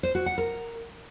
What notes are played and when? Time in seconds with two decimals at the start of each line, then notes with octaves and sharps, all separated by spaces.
0.03 C5
0.15 F#4
0.26 F#5
0.38 A#4